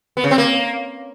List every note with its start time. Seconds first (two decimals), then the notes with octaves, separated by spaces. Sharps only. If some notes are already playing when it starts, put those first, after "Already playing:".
0.17 B3
0.24 C#3
0.31 C4
0.38 A#3